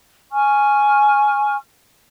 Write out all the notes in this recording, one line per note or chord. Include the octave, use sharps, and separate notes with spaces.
G#5 C#6 F6